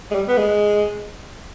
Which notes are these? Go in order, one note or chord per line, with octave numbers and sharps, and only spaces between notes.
G#3
G3
B3
G#3